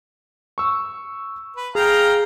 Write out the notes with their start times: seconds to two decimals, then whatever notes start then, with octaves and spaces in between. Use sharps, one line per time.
0.58 C#6 E6
1.57 B4
1.75 G#4 F5 G5 A#5